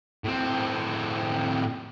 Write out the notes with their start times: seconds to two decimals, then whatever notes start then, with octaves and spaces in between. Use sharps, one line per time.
0.24 A2 C4